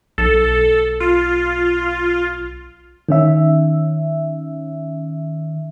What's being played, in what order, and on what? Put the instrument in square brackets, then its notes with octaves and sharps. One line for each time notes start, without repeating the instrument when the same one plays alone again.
[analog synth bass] B1 [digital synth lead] A4
[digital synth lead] F4
[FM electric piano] D#3 C#4 E5